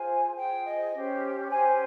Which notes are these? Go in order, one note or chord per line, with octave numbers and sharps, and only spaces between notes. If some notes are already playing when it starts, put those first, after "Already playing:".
Already playing: F4 G#4 C5 G#5
F4 G#4 C5 G5
D#5
C#4 G4 C5
C#4 G4 C5 G#5